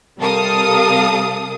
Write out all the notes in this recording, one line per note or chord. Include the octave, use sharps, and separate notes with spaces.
C3 G3 A4 A#4 F5 D#6